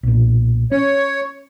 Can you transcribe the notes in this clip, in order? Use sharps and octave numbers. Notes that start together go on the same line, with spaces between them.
B1 A#2
C#4 C#5